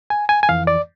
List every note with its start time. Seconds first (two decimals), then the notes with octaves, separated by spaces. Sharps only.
0.10 G#5
0.29 G#5
0.43 G#5
0.49 F2 E3 F5
0.67 D5